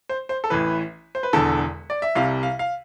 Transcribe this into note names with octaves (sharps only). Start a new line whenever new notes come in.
C5
C5
A4
A1 A2 E3 B4
C5
B4
E1 E2 D3 A4
D5
E5
C2 C3 G3 F5
F5
F5